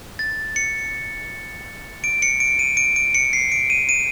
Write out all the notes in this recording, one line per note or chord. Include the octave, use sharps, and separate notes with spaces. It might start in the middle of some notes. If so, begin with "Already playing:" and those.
A6
C#7
D7
C#7
D7
D#7
D7
D7
C#7
C7
D7
D#7
D#7